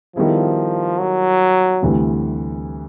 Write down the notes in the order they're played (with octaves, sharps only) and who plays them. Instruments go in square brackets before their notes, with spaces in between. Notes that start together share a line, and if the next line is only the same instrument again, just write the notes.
[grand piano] D#3 G3 B3 E4 G#4 [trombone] F3
[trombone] F#3
[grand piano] D2 C3 E3 G3